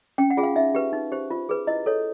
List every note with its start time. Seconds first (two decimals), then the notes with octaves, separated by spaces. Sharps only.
0.18 C#4 G5
0.30 F#5
0.37 F4 G#4
0.43 F5
0.56 D#4 E5
0.75 G4 B4
0.93 D#4
1.12 G4 C5
1.31 F4
1.49 G#4 B4
1.67 E4 D#5
1.86 A4 C#5